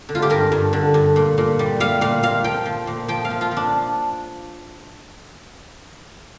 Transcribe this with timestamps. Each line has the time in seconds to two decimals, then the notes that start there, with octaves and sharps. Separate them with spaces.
0.09 D3
0.15 F4
0.22 G4
0.30 G2 A#4
0.52 G2
0.73 D3
0.94 G2
1.16 A#2
1.38 A#2
1.59 G3
1.80 G3 F5
2.01 A#2 F5
2.23 A#2 F5
2.44 F3 G5
2.66 F3
2.87 A#2
3.08 F3 G5
3.25 F5
3.30 F3
3.41 F4
3.51 F3
3.57 D4